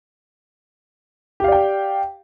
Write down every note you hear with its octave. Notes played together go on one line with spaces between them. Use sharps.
G4 D5 F5 G5